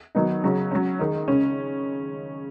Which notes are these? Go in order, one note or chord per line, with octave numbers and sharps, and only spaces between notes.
D#3 F#3 B3 D#4
C#3 F#3 C#4
F#3 C#4
D#3 G#3 D#4
C#3 G#3 C#4